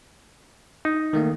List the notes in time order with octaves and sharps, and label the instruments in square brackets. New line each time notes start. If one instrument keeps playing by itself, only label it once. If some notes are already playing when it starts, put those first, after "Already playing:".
[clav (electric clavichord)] D#4
[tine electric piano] D#3 A3 A#3